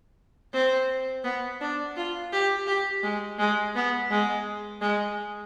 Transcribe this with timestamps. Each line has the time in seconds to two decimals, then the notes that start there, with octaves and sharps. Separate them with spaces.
0.53 C4
1.24 B3
1.61 D4
1.96 F4
2.32 G4
2.67 G4
3.03 G#3
3.39 G#3
3.75 B3
4.11 G#3
4.81 G#3